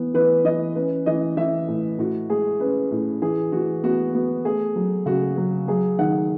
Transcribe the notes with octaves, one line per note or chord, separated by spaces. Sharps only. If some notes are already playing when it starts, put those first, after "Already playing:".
Already playing: E3 B3
E3 B4
E3 D#5
C#4 B4
E3 D#5
E3 E5
A2
A2 F#4
G#3 G#4
C#4 B4
A2
E3 G#4
E3 F#4
B3 F#4
B3 F#4
A3 G#4
F#3
C#3 F#4
F#3
F#3 G#4
D#3 F#5